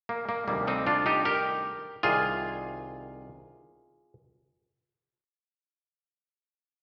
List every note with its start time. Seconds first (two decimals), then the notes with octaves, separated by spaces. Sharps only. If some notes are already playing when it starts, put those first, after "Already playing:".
0.09 A#3
0.29 A#3
0.48 D2 C3 D#3 G3 A#3
0.67 C4 D#4
0.87 D4 F4
1.06 D#4 G4
1.25 G4 A#4
2.03 C2 C3 D#3 F4 G#4